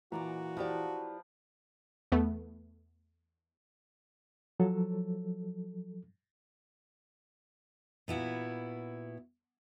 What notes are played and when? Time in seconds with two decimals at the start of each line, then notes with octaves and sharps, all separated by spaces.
0.12 A#2 E3 F#4 D5 A#5
0.57 F3 E4 G4 B4 D5
2.12 E2 A3 B3
4.60 F3 F#3 A4
8.08 A#2 B3 E4 F#4